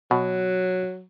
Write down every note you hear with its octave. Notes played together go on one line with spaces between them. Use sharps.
B2 F#3